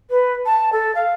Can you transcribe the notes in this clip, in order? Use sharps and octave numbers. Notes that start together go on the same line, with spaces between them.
B4
A5
A4
F5